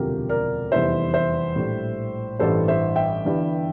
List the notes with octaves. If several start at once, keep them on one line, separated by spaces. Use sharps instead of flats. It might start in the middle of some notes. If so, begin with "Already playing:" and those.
Already playing: E1 D2 C3 F3 G4 A#4
A#4 D5
F1 E2 E3 G3 C5 E5
C5 E5
A#1 A2 G3
A1 G2 E3 G3 A4 C5
C5 E5
E5 G5
G1 G2 E3 G3